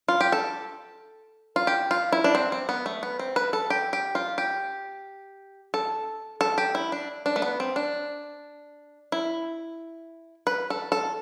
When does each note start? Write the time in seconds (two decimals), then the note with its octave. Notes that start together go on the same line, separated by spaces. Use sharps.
0.08 F4
0.21 G4
0.32 A4
1.56 F4
1.67 G4
1.91 F4
2.12 E4
2.24 D4
2.35 C4
2.52 C4
2.69 B3
2.86 A3
3.03 B3
3.19 C4
3.36 B4
3.53 A4
3.70 G4
3.93 G4
4.15 F4
4.38 G4
5.74 A4
6.41 A4
6.58 G4
6.75 E4
6.92 D4
7.26 D4
7.36 A3
7.42 B3
7.60 C4
7.76 D4
9.12 E4
10.47 B4
10.70 A4
10.92 A4